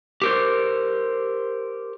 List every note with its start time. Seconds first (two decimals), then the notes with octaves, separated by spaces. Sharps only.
0.22 G4 A#4 C5